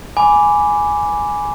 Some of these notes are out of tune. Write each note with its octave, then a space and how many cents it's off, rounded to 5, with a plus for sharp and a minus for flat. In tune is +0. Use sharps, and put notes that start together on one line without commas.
G#5 +0 B5 +0 D6 -10